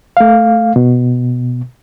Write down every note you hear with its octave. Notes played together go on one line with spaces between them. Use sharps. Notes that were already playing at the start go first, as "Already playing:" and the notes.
A3 F5
B2